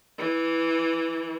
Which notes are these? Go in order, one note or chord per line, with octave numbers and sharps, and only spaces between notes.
E3